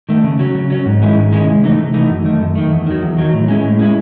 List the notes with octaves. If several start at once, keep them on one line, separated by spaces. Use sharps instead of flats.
D#3 A3
C#3
F#3 C#4
C#3
F#3 C#4
G#2
D#3 G#3 C#4 E4
G#2
D#3 G#3 C#4 E4
C3
E3 A3 D#4
C3
E3 A3 D#4
F#2
D#3 A3
F#2
D#3 A3
E2
D#3 F#3
E2
D#3 F#3
A2
G#3 C#4 E4
A2
G#3 C#4 E4